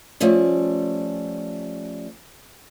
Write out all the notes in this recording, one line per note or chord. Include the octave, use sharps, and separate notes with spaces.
F3 G3 A3 C#4